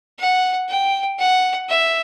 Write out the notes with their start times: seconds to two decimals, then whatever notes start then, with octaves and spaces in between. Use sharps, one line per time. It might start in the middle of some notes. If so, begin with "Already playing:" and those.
0.19 F#5
0.69 G5
1.18 F#5
1.69 E5